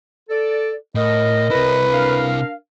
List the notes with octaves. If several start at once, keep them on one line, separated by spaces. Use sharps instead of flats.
A4 D5
A2 A#4 D#5
C3 E4 B4
D4 A#4 F5